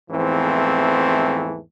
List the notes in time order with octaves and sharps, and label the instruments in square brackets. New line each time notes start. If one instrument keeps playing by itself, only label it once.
[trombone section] E2 G#2 E3 F3 A3 C4